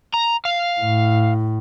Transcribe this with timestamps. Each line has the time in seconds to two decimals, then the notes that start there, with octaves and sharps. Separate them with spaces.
0.14 A#5
0.45 F5
0.80 A2